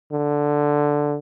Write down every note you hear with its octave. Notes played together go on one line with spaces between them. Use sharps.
D3